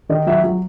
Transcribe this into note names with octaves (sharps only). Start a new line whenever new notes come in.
D#3 D#5
F#3 E5
F#3